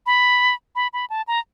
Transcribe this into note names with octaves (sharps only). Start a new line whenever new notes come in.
B5
B5
B5
A5
A#5